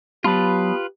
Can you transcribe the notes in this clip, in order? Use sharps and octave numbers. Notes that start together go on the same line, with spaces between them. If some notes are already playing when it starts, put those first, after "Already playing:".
F#3 B3 F4 G4 B4 A5 B5